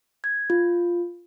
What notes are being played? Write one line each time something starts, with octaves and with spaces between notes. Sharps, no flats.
G#6
F4